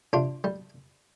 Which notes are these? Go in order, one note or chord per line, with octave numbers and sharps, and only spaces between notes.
C3 D4 F4
G3